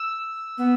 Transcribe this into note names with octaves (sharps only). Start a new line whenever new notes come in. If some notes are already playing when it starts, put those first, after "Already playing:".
Already playing: E6
B3